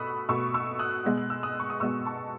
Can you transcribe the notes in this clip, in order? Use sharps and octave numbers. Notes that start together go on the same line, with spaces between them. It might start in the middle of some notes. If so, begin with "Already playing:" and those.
Already playing: B2 A3 B5 C#6 D#6 E6 F#6
B2 A3 C#6 E6
C#6 E6
D#6 F#6
B2 G#3 B3
F#6
E6
D#6 F#6
C#6
D#6
B2 G#3 B3 C#6 E6
A5 C#6